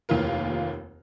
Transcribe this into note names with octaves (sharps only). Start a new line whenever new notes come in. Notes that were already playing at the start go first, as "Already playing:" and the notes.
F1 D#2 E3 F4 A#4